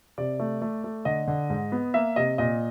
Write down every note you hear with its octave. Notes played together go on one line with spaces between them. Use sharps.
C3 D5
A3
A3
A3
D3 D#5
D3
G#2
B3
A#3 E5
C3 D#5
A#2 D#5